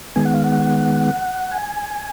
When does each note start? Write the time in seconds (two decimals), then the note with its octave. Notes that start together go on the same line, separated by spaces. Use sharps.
0.16 D#3 G#3 B3 G#5
0.25 F#5
0.34 F5
0.44 F#5
1.51 G#5